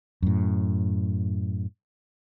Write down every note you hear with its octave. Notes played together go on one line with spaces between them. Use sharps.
F#2 A2